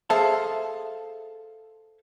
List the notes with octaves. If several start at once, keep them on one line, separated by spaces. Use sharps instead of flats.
G#4 A4 C5 E5 F5 A5